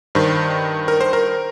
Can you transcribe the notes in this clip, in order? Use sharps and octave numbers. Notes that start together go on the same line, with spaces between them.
G2 D#3 C5
A#4
C5
A#4